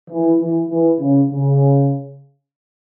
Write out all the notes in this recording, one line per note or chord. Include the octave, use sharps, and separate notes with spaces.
E3
E3
E3
C#3
C#3